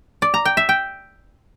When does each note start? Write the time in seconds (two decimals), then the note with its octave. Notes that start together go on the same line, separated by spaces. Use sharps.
0.22 D5
0.34 A#5
0.45 G5
0.57 E5
0.69 G5